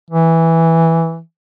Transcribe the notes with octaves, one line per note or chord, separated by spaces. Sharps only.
E3